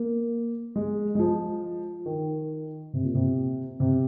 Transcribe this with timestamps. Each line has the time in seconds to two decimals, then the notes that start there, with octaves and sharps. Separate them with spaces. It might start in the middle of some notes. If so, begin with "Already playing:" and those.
Already playing: A#3
0.76 G#3
1.15 G#3
1.19 F3
2.06 D#3
2.93 C3
3.04 A#2
3.15 C3
3.80 C3